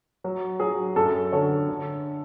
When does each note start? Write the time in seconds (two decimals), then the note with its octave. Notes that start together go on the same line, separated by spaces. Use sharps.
0.24 F#3
0.60 F#3 G#4
0.96 F#2 A4
1.32 D3 A4 C#5
1.69 D3